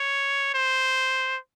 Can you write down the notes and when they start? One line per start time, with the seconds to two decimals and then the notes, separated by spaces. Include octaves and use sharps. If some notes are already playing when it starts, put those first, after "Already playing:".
Already playing: C#5
0.54 C5